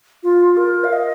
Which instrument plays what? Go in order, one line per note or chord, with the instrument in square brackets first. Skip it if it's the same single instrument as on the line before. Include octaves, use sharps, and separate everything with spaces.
[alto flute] F4
A#4
F5
D#5